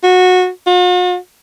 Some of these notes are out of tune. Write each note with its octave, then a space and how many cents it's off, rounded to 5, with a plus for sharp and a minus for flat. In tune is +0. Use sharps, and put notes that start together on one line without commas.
F#4 -20
F#4 -45